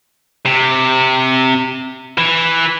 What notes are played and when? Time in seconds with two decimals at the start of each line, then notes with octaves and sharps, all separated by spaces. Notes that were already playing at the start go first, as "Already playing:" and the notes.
0.46 C3
2.18 E3